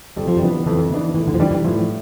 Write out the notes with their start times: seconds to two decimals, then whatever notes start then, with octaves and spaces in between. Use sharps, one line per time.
0.16 F2 G3
0.27 F3
0.37 G3
0.42 E3 B3 D4
0.66 F2 E3
0.90 E3 B3 D4
1.14 A2 E3
1.27 D3
1.34 F3
1.39 E3 G3 D4
1.51 E3
1.64 A2 F3